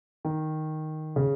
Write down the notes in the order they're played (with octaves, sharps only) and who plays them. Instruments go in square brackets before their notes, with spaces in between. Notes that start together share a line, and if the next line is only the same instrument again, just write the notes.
[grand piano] D#3
C#3